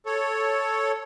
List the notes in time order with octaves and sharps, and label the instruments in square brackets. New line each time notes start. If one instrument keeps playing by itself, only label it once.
[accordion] A4 C#5